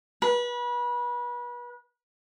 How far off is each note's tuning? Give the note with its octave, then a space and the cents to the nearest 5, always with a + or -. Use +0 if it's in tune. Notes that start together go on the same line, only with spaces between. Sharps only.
B4 -30